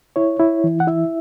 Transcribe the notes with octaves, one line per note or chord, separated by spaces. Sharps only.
E4 C#5
E4
E3
F#5
E4 E5